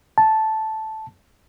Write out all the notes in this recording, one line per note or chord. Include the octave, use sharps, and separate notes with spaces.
A5